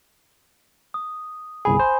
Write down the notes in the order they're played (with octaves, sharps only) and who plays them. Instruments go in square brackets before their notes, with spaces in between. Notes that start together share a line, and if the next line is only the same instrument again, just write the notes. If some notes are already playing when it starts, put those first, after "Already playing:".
[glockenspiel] D#6
[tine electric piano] G1 C2 G#4 [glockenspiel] G#5 B5
[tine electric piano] C5